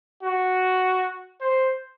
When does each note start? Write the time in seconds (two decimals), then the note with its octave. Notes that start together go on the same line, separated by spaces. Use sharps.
0.23 F#4
1.41 C5